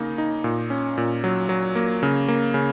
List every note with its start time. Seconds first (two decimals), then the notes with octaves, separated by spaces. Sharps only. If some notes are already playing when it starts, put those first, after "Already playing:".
Already playing: C#3 A#3 D#4
0.18 D#4
0.44 A#2
0.70 C#4
0.98 A#2
1.24 F#3
1.49 F#3
1.75 A#3
2.03 C#3
2.28 A#3
2.54 C#3